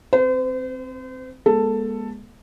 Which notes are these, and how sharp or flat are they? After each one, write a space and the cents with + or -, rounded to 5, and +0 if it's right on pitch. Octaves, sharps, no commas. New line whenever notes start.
C4 +0 C5 -40
G#3 +0 B3 -45 A4 +10